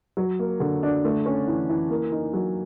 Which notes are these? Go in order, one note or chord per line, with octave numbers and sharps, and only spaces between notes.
F#3
A#3
D3
D4
A3
C#4
E3
E3
A#3
D#4
F#3